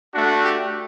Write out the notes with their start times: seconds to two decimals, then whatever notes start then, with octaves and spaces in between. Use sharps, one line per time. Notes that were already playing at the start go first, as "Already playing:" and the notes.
0.12 A3 D4 F#4
0.41 G4